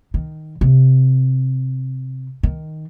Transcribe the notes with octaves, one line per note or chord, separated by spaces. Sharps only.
D#3
C3
D#3